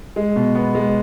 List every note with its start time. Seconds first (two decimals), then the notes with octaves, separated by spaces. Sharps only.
0.16 G#3
0.36 B2
0.55 B3
0.75 G#3